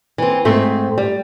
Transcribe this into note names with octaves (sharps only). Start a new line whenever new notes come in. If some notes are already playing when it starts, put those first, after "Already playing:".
E3 C4
G#2 A3 C4
G3